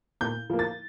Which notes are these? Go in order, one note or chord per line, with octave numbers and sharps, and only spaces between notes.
A#2 G6
F3 A#3
A6